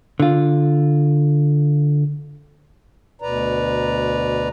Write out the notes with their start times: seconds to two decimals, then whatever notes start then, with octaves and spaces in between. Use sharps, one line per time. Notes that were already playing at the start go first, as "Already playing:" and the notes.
0.20 D3 F4
3.22 D2 B2 B4 D5 A#5